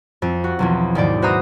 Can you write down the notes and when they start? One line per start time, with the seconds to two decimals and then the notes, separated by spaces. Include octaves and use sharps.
0.22 F2
0.44 F#4
0.59 B1 E2 F3
0.95 D#2 G#2 D5
1.22 F#4 B4 C5 E5 A#5 D#6